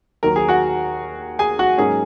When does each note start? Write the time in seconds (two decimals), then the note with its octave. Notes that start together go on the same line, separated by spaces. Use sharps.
0.23 D#2 D#3 F#3 A#4
0.36 G#4
0.48 F#4 F#5
1.39 G#4 G#5
1.59 F#4 F#5
1.78 G#2 F#3 A#3 C#4 G#4